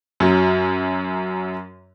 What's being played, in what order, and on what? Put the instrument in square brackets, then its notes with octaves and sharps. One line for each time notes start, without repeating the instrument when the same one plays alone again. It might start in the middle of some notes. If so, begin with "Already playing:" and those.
[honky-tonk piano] F#2 F#3